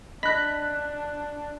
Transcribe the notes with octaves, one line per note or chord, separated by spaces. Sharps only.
D4 D#5 B5 F#6 A#6 B6